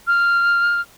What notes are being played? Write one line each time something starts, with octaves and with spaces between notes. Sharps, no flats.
F6